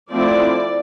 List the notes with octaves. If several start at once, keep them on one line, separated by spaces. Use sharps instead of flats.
F3 A3 C4 E4 D5